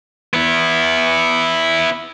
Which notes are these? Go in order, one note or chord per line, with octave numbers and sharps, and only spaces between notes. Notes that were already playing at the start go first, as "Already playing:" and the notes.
B3 E4